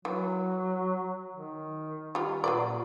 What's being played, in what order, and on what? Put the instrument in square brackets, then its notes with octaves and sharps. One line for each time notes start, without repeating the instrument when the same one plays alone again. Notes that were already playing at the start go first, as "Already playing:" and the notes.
[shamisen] E3 [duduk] F#3
[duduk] D#3
[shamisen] G3 F4
[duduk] A#2 [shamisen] F#3 B4 D5